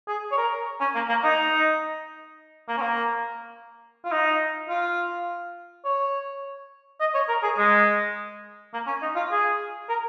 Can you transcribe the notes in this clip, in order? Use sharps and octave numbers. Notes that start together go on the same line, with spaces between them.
G#4
C#5
A#4
C#4
A#3
A#3
D#4
A#3
C#4
A#3
F4
D#4
F4
C#5
D#5
C#5
A#4
G#4
G#3
A#3
C#4
D#4
F4
G#4
A#4